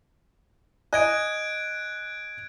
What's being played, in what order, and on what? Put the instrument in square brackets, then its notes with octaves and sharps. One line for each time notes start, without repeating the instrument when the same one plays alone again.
[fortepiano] D#5 G#5 [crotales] F#6 G#6 D7